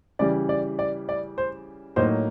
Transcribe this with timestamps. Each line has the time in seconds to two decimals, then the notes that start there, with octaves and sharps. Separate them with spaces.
0.19 C#3 E3 G3 D5
0.49 D5
0.79 D5
1.09 D5
1.38 C5
1.96 A2 F#3 A#3 D#4 C5